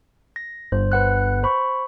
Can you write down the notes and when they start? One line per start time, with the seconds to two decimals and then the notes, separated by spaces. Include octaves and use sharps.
0.36 A#6
0.72 G1 C5
0.92 B4 F#5 F#6
1.43 C5 B5 C#6